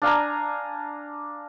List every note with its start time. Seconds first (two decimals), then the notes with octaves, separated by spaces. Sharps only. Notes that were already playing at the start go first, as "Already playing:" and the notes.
0.02 D4 F5 G#5 A#5